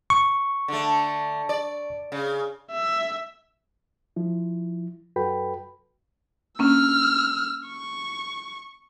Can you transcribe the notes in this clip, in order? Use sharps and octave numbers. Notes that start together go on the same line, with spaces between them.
C#6
D3 A3
D5
C#3
E5
F3 E4
F#2 F#4 A4 B4 G5 B5
A#3 C#4 D4 E6 F6
C#6